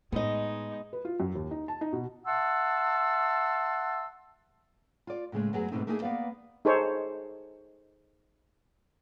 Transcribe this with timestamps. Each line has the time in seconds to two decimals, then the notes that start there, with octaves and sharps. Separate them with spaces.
0.12 A2 G#3 B3 D#4 D#5
0.93 B4
1.05 F4
1.20 F#2
1.35 D#2
1.51 D#4
1.68 A5
1.81 D#4
1.93 B2
2.26 E5 F#5 A5 C6 E6
5.07 F4 D5
5.32 A2 C#3 G#3 A3
5.53 F#2 F#3 B3 G#4
5.71 E2 G#2 B2 A3 C4 D#4
5.87 A3 A#3 D4 D#4 G4 G#4
6.02 A#3 B3 D5 F5
6.65 D#4 G#4 A4 C5 C#5